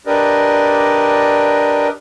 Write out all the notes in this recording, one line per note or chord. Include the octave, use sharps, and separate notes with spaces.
D4 G4 A#4 B4 D5 D#5